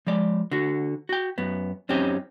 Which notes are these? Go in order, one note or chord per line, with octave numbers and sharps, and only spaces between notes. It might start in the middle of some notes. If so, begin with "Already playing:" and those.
F3 G#3 D5
D3 F#4
F#4 G5
F#2 B3
F#2 C4 C#4 D#4 G4